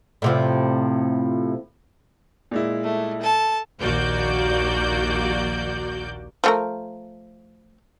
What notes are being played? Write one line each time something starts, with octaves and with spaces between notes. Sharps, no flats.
A2 C3 F3
A#2 G#3 E4
A3
A4 A5
A#1 D#2 A#3 F#4 D5 G6
F3 A3 A#4